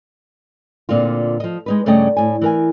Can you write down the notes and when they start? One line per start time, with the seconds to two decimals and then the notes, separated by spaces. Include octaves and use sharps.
0.89 A#2 D3 C4 F4
1.40 F3 D#5
1.66 G#3 D#4 B4
1.86 G2 C#3 A3 D5 D#5 G5
2.16 A2 G#5
2.41 E3 A#4 G#5